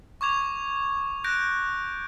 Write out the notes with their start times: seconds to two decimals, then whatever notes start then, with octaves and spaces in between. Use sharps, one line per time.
0.21 C#6 D6 G#6 F7
1.24 F#6 G6 A#6 D7